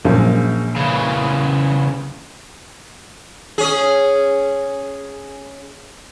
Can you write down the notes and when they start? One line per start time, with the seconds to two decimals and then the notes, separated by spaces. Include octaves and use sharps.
0.05 A#1 F#2 G#3
0.76 C#3 E3
3.58 C#4 G#4